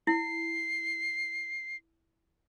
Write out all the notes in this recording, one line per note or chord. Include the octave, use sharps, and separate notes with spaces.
E4 C7